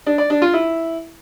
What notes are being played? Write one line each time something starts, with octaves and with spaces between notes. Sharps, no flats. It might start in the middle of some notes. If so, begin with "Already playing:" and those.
D4
D5
D4
F4
E4